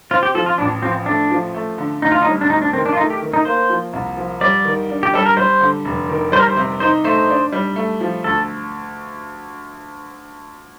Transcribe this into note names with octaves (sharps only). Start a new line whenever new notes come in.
C4 F4
G4
F3 A4
F4
A1 D4
F3 C4
A3 D4
F3
A3
D3
D2 D#4
F4
D#4
G3
D4
D2 D#4
D4
D#3 C4
D4
F4
A3 D#4
G4
D#3
D#4
A#3 C5
F3
C2
F3
G3 D5
D#3
D4
G4
G3 A4
A#4
G3 C5
D3
F1
D#3
G3 C5
A#4
C5
C3
D#4 C5
A3 C5
D4
G3
A3
F3
D2 A4